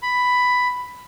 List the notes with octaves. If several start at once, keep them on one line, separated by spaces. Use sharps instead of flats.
B5